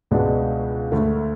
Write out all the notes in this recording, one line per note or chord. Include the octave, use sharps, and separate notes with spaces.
C#2 B2 G#3 D4 F#4
D2 D3 A3